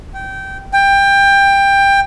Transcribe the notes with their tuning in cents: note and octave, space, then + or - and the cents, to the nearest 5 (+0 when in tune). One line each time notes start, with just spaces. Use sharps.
G5 -20
G5 +20